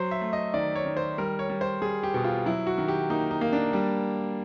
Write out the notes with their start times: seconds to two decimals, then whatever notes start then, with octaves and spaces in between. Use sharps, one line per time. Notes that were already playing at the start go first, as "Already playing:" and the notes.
Already playing: F#3 C5
0.11 E5
0.21 A3
0.33 D#5
0.54 D#3 D5
0.75 C#5
0.86 D#3
0.97 C5
1.18 G3 A#4
1.39 C#5
1.50 G3
1.61 C5
1.82 G3 G#4
2.03 G4
2.14 B2
2.24 F4
2.46 F#3 E4
2.67 F#4
2.78 D#3
2.88 G4
3.10 A#3 D#4
3.31 D#4
3.41 A#3
3.53 D4
3.73 G3